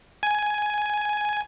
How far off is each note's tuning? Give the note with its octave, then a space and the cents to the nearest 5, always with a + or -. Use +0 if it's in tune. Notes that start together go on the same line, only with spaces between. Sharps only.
G#5 +10